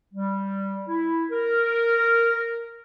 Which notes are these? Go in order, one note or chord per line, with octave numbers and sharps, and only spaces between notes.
G3
E4
A#4